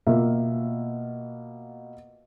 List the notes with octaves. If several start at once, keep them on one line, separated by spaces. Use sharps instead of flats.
B2 A#3 F4 E5